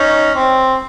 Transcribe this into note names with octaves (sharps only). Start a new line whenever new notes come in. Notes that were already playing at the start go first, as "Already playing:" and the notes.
Already playing: C#4 D#4
C4